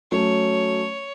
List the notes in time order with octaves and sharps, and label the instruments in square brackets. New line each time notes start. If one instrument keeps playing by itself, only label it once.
[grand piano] F#3 A3 C#4 [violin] C#5